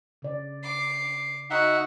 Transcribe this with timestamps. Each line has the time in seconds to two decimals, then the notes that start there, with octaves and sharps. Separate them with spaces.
0.22 C#3 D5
0.63 D6 C7
1.50 D#4 F#4 E5 F#5